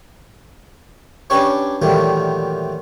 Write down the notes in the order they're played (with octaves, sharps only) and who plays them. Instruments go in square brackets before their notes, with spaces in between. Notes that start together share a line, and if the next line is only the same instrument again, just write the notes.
[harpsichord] C#4 D4 G4 B4 C#5 D5
A#2 D#3 E3 F#3 G3 A3